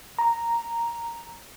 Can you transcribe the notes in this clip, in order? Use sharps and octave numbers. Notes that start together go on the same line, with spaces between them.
A#5